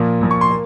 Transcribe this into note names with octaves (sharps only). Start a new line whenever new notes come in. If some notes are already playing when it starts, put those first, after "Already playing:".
Already playing: A#2 F3 A#3
A#2 F3 A#3
C#6
C6
A#3